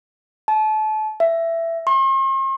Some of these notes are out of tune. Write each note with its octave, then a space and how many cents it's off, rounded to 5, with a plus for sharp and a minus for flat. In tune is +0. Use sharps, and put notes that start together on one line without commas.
A5 -30
E5 +15
C6 +45